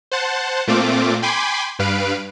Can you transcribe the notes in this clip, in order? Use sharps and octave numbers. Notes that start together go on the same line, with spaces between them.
C5 F#5 A5
A#2 A3 C4 F4 D6
G5 G#5 B5 C6 D6
G2 B4 F5 D7